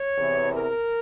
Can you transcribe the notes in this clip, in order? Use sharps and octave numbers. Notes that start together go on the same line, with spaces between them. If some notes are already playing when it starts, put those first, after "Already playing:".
Already playing: C#5
E2 C3 E3
A#4